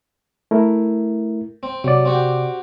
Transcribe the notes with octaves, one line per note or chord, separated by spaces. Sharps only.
A3 E4 A#4
C4
C3 F#3 D5
C4 F#4 G4